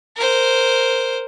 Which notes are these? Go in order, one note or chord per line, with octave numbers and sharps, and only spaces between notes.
A#4 C5